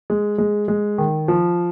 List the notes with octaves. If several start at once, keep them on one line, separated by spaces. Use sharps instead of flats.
G#3
G#3
G#3
D#3
F3